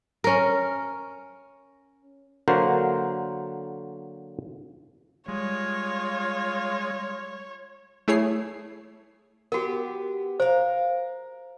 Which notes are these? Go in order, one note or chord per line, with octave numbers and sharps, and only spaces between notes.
C#4 A#4
D3 F#3 A#3 F#4 A#4 C5
G3 G#3 F4 C#5
A3 E4 G#4 C#5 C7
B3 F#4 G4 A#4
A#4 C5 F5